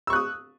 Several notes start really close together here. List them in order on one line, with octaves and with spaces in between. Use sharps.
E6 C#6 F#6 D#6